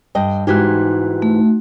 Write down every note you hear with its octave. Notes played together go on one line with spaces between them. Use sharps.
G2 D#5 G5
G#2 E3 D#4 F#4 G4 F#6
A3